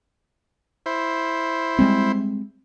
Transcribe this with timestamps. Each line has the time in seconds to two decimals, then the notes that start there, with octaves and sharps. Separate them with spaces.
0.86 E4 C5
1.79 G3 G#3 C4